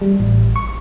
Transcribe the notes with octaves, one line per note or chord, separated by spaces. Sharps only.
G3
A1
C#6